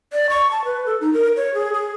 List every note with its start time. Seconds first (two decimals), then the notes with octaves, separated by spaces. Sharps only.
0.13 D5
0.30 C#6
0.51 A5
0.65 B4
0.86 A4
1.01 D#4
1.13 A#4
1.37 C#5
1.54 G#4
1.73 G#4